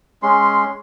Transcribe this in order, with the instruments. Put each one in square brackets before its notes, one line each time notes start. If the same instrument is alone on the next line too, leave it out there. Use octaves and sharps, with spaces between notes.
[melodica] G#3 C#4 C6